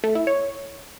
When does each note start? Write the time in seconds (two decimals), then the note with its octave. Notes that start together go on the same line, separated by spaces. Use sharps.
0.04 A3
0.15 E4
0.27 C#5